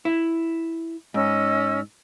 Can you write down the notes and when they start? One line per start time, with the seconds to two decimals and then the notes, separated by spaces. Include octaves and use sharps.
0.05 E4
1.14 G#2 C#4 D#5 E6